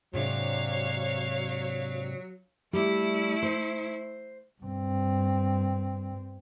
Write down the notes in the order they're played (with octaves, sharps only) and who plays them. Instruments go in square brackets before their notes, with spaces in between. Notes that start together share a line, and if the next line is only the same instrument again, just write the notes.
[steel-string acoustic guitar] G#2 C3 D4 [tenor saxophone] F#3 [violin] C#5 F5
[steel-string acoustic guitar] G3 [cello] A3 E4
[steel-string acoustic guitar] C5
[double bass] G2 C4